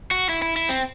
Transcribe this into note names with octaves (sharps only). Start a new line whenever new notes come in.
F#4
E4
E4
E4
C4